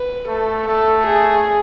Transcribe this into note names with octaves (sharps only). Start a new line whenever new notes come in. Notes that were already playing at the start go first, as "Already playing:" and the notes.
Already playing: B4
A3 A4
A3 A4
G#4